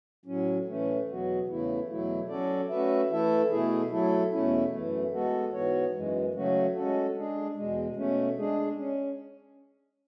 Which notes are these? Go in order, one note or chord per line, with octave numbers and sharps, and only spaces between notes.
A2 F#3 C#4
A2 E3 A3 C#4
E2 B2 F#3 B3 F#4
E2 C#3 E3 A3 E4
E2 B2 F#3 A3 E4
F#3 C#4 F#4 A4 D5
A3 C#4 F#4 B4 E5
E3 A3 E4 A4 E5
B2 A3 E4 G#4
F#3 A3 E4 A4
E2 B2 A3 C#4 E4
F#2 E3 A3
G#3 B3 F#4 A4
G#2 E3 B3 F#4 C#5
F#2 E3 G#3
C#3 F#3 A3 C#4 F#4
G#3 C#4 F#4 A4
G#3 D4 G#4
E2 B2 G#3
B2 A3 C#4
G#3 D4 G#4
C#4